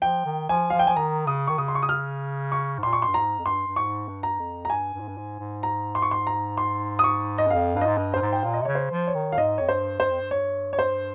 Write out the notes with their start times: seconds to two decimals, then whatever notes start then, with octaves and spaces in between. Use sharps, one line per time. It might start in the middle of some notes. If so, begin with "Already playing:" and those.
0.02 F3 G5
0.26 D#3
0.49 F3 G#5
0.70 F3 F5
0.79 G5
0.87 F3 G#5
0.96 D#3 A#5
1.27 C#3 D#6
1.47 D#3 C#6
1.58 C#3 D#6
1.68 C6
1.75 C#6
1.83 D#6
1.89 F6
2.52 C#6
2.78 G#2
2.83 A#2 C6
2.93 C#6
3.02 C6
3.08 G2
3.14 G#2 A#5
3.39 F2
3.45 G2 C6
3.67 G2
3.76 G#2 C#6
4.08 G2
4.23 A#5
4.39 F2
4.65 A#5
4.70 G2 G#5
4.94 G2
5.00 G#2
5.08 G2
5.17 G#2
5.40 G#2
5.63 A#5
5.95 C6
6.02 C#6
6.11 C6
6.27 A#5
6.58 C6
6.99 D#6
7.04 C#6
7.38 D#5
7.47 G2
7.50 F2 F5
7.74 G2 F5
7.81 D#5
7.86 G#2
7.97 G2
8.14 G2 C5
8.22 G#2
8.33 G5
8.43 A#2 F5
8.54 D#5
8.62 C3
8.65 C#3 C#5
8.75 C5
8.91 F3
9.07 C#5
9.15 D#3
9.32 F5
9.38 G#2 D#5
9.58 F2 C#5
9.69 G2 C5
10.00 G2 C5
10.10 F2
10.21 G2
10.31 C#5
10.73 C#5
10.79 C5